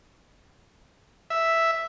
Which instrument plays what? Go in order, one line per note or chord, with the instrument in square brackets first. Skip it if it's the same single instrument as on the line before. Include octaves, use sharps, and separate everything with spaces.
[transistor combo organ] E5